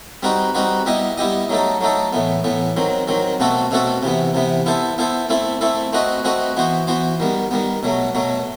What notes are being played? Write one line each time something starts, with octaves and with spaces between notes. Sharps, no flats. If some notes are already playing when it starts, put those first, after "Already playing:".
G3 C4 D#4 F#4 B4
G3 C4 D#4 F#4 B4
G3 B3 E4 G4 D#5
G3 B3 E4 G4 D#5
F#3 A3 D#4 A4
F#3 A3 D#4 A4
A2 E3 B3
A2 E3 B3
D#3 F#3 C4
D#3 F#3 C4
B2 A3 C4 F#4 A4
B2 A3 C4 F#4 A4
C3 E3 B3
C3 E3 B3
B3 E4 A4 C5
B3 E4 A4 C5
A3 C4 E4 A4
A3 C4 E4 A4
A3 C4 F#4 B4 D#5
A3 C4 F#4 B4 D#5
E3 B3 F#4 C5
E3 B3 F#4 C5
D#3 G3 B3
D#3 G3 B3
B2 F#3 A3
B2 F#3 A3